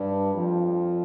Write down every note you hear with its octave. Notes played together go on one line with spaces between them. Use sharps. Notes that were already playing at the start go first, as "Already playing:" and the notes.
Already playing: G2 G3
F2 F3